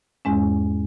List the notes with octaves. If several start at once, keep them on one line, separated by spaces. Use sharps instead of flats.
E2 G#2 G#3 C#4